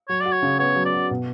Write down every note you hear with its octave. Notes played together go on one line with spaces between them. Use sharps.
F#3 C#5
D5
F#4
C#5
C#3
B3 C#5
F#3
D5
F#4
B2